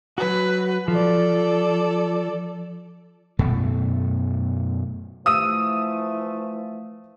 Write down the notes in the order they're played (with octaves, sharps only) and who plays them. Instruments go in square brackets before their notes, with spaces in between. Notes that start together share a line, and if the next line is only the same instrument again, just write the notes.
[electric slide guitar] F#3 F#4 [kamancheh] B4
[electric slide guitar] F3 [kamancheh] A4 D5
[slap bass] F#2 B2 A3
[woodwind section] E3 F3 A3 [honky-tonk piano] D#6 E6 D#7